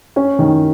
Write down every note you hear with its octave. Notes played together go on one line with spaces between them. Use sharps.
C#4
D#3